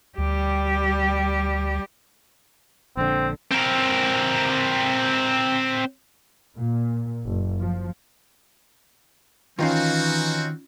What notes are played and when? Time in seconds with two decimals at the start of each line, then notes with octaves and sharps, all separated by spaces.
0.18 D2 G3 G4
2.97 A#1 D3 C4
3.52 C4 A#4
6.58 A#2
7.25 F#1
7.60 F3
9.59 D#3 E3 C4 C#4 D#4 F4 F#4 F5